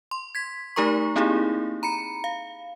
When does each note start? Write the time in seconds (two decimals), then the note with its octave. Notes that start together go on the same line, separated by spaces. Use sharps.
0.11 C6
0.35 G#6 B6
0.76 A3 D#4 G4 A#4 A#5 C#6
1.16 A#3 C4 D#4 E4 G4 G#4
1.83 A#5 B5 C#7
2.24 F5